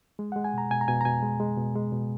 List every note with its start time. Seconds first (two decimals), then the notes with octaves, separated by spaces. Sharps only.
0.19 G#3
0.32 F#5
0.36 G#3
0.44 G#5
0.53 B2 A#5
0.71 B2 G#5
0.81 A#5
0.88 B2 G#5
1.01 A#5
1.05 B2 G#5
1.23 G#3
1.40 G#3
1.57 B2
1.75 G#3
1.92 B2